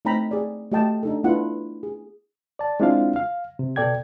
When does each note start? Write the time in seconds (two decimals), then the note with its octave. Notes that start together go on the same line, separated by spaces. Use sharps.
0.05 A3 C4 D#4 G5 A#5 B5
0.31 G#4 D5
0.72 A3 F#4 G4 D#5 G5 A5
1.03 D4 D#4 A4
1.24 A3 B3 D4 E4 F4 F#5
1.83 G#4
2.59 D5 A5
2.80 G#3 C4 D4 E4 F4 F5
3.16 F5
3.59 C3
3.76 B2 A4 D5 G5 G#6